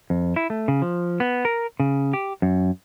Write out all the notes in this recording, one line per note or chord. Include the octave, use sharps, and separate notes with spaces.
F2
E4
A3
C#3
F3
B3
A#4
C#3
G4
F#2